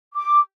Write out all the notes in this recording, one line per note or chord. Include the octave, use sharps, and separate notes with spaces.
D6